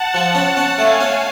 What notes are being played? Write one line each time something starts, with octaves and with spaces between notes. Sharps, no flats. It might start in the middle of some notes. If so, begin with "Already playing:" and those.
Already playing: F#5 A5
F3
C#4
C#4
A3 F5 G#5
C#4